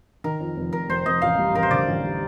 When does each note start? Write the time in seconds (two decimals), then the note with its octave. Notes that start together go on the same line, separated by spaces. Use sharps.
0.24 D#3 A#4
0.40 F2
0.57 F1
0.72 F1 A#4
0.89 F1 C5
1.06 F1 D#5
1.22 A1 F5
1.38 G3
1.54 A1 A#4
1.63 C5
1.71 D3 D5
1.88 A1
2.04 G3